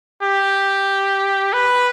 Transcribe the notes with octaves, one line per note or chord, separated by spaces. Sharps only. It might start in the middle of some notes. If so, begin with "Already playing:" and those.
G4
B4